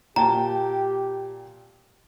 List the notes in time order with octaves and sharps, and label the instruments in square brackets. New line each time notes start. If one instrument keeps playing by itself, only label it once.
[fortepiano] A#2 G5 A5 [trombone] G4 [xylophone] A#5